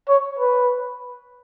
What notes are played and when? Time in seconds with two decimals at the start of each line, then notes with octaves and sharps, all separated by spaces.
0.09 C#5
0.39 B4